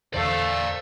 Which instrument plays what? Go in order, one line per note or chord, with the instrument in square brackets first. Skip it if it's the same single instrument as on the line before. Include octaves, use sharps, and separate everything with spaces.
[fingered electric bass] E2 D3 [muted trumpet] A3 [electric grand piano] A4 C5 [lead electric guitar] D5 F5